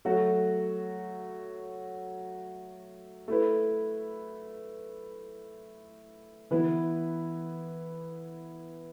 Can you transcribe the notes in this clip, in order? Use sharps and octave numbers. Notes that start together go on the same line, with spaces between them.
F#3 A3 F#4
A3 E4 B4
E3 B3 E4 B4